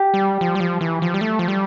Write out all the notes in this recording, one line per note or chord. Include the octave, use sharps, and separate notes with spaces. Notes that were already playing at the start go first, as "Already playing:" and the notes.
Already playing: G4
G3
F3
G3
F3
E3
F3
G3
A3
F3
G3